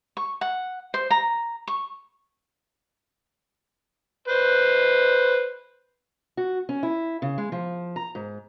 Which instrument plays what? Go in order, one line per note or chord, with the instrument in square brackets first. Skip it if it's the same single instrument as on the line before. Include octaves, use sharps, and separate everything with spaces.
[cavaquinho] C#6
F#5
C5
A#5
C#6
[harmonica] B4 C5
[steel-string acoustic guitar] F#4
C#4
E4
C#3
G#3
F3
A#5
G#2